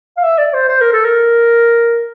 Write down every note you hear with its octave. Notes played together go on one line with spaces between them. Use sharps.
F5
E5
D5
C5
C5
A#4
A4
A#4